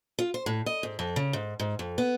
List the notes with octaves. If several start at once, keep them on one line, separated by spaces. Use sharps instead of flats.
F4
C5
A2
D#5
G#2
F2
C#3
G#2
G#2
F2
B3